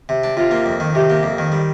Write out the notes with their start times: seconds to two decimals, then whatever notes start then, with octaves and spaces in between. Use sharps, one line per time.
0.09 C3
0.24 D4
0.37 C3 F4
0.51 A#3
0.66 F2
0.80 D#3
0.95 C3 G4
1.10 A#3
1.23 F2
1.38 D#3
1.52 G3